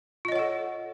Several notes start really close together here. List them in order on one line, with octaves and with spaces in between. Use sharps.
F4 D#5 C#5 F#5 A4